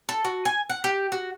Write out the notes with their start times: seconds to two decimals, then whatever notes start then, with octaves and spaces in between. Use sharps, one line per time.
0.09 A4
0.25 F#4
0.45 G#5
0.70 F#5
0.84 G4
1.12 F#4